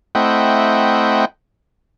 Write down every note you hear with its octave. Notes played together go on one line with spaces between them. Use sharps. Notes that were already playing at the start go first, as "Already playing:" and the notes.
A3 C4 E4 D#5 F#5 G5